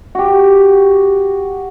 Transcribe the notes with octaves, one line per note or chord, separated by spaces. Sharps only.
F#4 G4